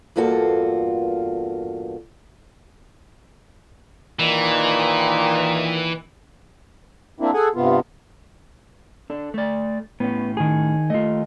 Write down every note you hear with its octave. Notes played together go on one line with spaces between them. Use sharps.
E2 G2 A#3 F4 F#4 A4
A#2 D#3 E3
A#3 C4 D4 E4
G#4 A4 F#5 G#5
G2 C3 B3 F4
D4 A4
A3 D5
A2 B3 C#4
D#3 G#4
D#2 A3 F4 D#5